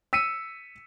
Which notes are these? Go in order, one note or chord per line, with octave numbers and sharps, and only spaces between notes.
E6 B6 C#7 D#7